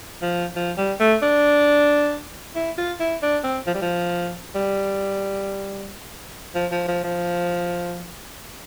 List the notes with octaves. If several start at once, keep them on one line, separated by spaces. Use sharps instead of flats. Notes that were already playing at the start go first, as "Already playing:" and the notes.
F3
F3
G3
A3
D4
E4
F4
E4
D4
C4
F3
G3
F3
G3
F3
F3
F3
F3